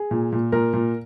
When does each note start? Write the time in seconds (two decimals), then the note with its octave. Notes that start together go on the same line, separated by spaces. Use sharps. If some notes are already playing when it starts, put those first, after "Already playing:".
Already playing: G#4
0.11 A#2
0.32 A#2
0.52 A#2 A#4
0.73 A#2